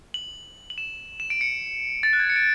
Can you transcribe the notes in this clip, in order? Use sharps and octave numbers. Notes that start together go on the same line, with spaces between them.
F#7
F#7
E7
E7
D7
C#7
A6
F#6
G#6
C#7
D7